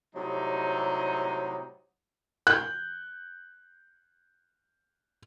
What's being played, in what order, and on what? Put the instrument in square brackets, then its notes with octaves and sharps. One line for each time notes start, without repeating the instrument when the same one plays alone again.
[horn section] A2 C3 F#3 G3 D#4
[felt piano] F#6 G6